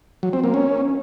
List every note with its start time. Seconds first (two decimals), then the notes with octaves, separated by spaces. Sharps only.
0.23 F#3
0.33 C4
0.44 A#3
0.54 C#4